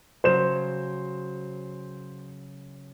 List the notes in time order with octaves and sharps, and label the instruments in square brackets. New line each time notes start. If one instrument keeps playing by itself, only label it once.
[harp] C#3 F#3 [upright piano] C5 E7